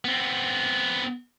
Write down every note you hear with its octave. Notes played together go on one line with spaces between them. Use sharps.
B3 C4